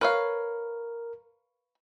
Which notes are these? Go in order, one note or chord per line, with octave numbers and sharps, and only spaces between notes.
A#4 B4 C#5 F5